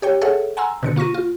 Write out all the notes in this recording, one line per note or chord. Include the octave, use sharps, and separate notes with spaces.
G4 C#5 G5
G#4 A4 C#5 E5 F#5
F#5 G#5 A#5 C6 E6
B2 D3 C#7
A#3 F4 C#6 A#6 D#7
F4